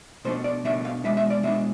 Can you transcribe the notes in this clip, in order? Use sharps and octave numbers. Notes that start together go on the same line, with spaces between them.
B2 A3 D4 C5
D5
B2 A3 D4 E5
F5
B2 G#3 D4 E5
E5
D5
B2 G#3 D4 E5